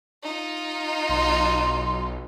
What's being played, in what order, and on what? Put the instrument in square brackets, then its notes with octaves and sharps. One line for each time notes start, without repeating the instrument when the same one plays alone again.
[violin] D#4 F4
[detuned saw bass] B1 [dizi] C6